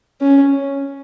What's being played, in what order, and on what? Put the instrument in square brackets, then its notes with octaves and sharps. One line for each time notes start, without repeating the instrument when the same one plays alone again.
[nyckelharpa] C#4